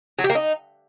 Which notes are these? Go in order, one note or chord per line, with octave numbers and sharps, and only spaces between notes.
F#3
G4
A#3
D#4